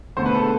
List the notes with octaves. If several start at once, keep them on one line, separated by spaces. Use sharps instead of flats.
E1 E2 D3 A3 C5
B4
A4